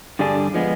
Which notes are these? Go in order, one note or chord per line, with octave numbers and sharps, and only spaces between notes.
G2 D3 G3 D4 G#4
F3 G#3 B3